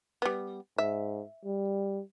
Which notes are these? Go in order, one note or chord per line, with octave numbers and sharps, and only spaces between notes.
G3 B3
G#2 E5
G3